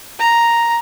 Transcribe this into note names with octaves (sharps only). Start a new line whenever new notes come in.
A#5